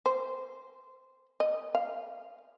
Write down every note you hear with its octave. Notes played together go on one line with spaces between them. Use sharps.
C5
D#5
F5